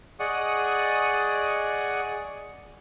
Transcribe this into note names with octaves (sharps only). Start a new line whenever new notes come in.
G#4 D5 D#5 F#5 C#6 D#6